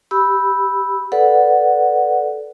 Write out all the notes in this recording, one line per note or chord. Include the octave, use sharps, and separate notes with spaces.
G4 B5 E6
A4 B4 D5 F#5